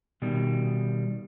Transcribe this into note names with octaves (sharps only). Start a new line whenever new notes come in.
B2 D#3 G3